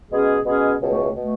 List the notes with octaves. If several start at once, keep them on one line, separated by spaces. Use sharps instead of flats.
B2 G#3 C#4 G#4
B2 G#3 C#4 G#4
C#2 B2 A3
B2 A3